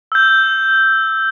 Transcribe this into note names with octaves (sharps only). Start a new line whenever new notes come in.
E6 G6